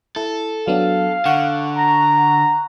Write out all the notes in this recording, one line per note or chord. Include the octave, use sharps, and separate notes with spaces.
E4 A4
F#3 B3 D4 F5
D3 F#5 C#6 F#6
A#5